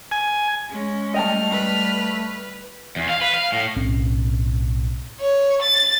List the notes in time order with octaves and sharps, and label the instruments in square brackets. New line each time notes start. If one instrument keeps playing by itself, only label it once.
[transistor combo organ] G#5
[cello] G#3 C#4
[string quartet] G3 F6 [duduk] A3 [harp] D#5 G5 A5
[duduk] A3 [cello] B4
[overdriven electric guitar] E2
F5
B4
F5
A2
[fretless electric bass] B1 A2 C4 C#4
[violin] C#5
A6